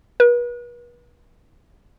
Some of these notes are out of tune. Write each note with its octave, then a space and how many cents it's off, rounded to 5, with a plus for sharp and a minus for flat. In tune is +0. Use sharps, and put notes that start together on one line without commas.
B4 -40